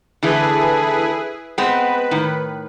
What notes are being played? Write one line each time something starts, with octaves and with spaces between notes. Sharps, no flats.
D3 E3 A3 E4 G#4 B4
G#3 B3 C4 B4
A2 D#3